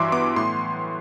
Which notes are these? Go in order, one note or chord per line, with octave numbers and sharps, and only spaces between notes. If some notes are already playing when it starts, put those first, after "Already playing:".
Already playing: G2 E3 F#3 E5 C6 D6
B3 D6
A2 C6